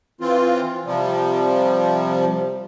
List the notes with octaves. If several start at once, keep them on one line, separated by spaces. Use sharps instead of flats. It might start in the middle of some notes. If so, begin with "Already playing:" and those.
E3 C4 F4
C3 F3 G3